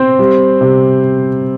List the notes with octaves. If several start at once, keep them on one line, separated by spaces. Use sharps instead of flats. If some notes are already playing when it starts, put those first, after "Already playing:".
Already playing: C4 C5
G3
C3